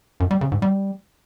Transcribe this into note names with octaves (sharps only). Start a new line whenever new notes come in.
F#2
G3
C#3
G#2
G3